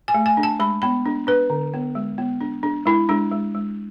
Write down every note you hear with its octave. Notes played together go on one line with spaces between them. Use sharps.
G#5
A3
G#5
D4
A5
G#3 B5
B3 B5
D4
D4 B4
D3
B3
G#3
B3
D4
D4
G#3 E4
G#3 D4
G#3
G#3